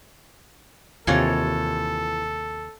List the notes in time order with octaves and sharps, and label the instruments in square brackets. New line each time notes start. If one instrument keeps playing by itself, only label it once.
[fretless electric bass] D#2 C3 [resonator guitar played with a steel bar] E3 F4 C#5 [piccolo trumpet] A4